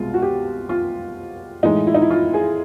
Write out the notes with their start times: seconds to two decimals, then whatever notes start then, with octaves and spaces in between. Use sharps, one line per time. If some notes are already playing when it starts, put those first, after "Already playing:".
Already playing: C2 B2 G#3 F4
0.14 F#4
0.22 G4
0.69 F4
1.63 A2 E3 G#3 D#4
1.87 E4
1.94 D#4
2.02 E4
2.11 F4
2.34 G#4